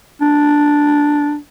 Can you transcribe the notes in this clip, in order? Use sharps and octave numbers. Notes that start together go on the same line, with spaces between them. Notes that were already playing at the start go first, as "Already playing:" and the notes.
D4